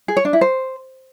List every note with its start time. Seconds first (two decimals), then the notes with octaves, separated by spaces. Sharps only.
0.08 G#4
0.17 C#5
0.25 D4
0.33 E4
0.41 C5